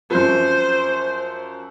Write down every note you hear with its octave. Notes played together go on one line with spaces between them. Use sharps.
F#2 F3 C5